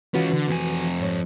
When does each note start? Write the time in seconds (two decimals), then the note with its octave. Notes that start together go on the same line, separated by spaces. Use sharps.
0.14 E3 C#4 F4 F#4 B4
0.33 D3
0.48 F2 G#5
1.01 G#2 C#5